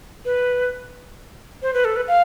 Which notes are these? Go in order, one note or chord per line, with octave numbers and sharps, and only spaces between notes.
B4
C5
B4
A4
B4
F5